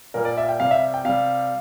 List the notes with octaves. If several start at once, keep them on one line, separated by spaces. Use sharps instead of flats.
A#2 G3 A#4
D5
E5
G5
C3 G3 F5
E5
G5
C3 G3 F5